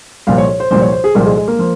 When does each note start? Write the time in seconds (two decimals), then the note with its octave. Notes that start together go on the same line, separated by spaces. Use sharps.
0.27 C2 A#2 F3 F5
0.38 C#5
0.49 C#5
0.60 C5
0.71 C2 A#2 F3 C5
0.82 C#5
0.92 C5
1.04 G#4
1.15 C2 A#2 F3 A#3
1.26 G#3
1.37 G#3
1.48 A#3
1.59 F3